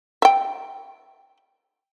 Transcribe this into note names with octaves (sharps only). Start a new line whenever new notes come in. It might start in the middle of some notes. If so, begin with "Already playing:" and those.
E5 G5